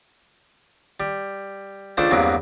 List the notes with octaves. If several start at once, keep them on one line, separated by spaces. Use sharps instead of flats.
G3
C#2 A3 D4 C5 A5
E2 G2 C3 F#3 A#3